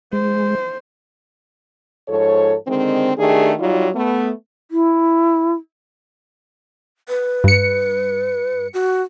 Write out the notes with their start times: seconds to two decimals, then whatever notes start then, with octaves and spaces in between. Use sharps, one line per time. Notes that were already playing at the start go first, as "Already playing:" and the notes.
0.13 G#3 C5
2.09 G#2 F3 A4 C#5
2.68 D3 D#3 G#3 C4
3.18 D#3 A3 D4 G4 G#4
3.59 F#3 G3 D#4 F4
3.95 A3 B3
4.71 E4
7.09 B4
7.44 G2 C#7
8.74 F#4